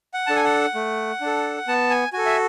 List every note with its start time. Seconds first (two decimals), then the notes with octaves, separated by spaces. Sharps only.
0.14 F#5
0.27 D4 A4 A5
0.36 G#5
0.44 F#5
0.75 A3
1.21 D4
1.26 A4
1.68 B3 A5
1.90 G#5
2.13 F#4 A4 G#5
2.26 E5